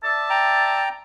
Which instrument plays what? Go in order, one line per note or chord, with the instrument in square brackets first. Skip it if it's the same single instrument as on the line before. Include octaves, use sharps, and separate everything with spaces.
[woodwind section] D5 E5 A5
[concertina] G5 A#5